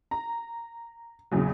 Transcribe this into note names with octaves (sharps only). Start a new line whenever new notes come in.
A#5
A#1 E2 C#3 F#3